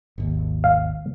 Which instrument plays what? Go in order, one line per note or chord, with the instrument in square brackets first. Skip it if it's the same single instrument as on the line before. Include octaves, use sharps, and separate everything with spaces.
[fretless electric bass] G#1 D#2
[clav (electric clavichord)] F5